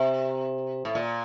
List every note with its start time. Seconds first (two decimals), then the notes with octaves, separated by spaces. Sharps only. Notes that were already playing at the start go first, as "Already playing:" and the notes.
Already playing: C3
0.85 A2
0.95 A#2